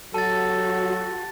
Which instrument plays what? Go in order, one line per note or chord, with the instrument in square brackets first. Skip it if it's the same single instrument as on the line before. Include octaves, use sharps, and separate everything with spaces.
[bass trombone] F#3 [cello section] F#4 G4 [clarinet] A4 [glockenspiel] A5 A6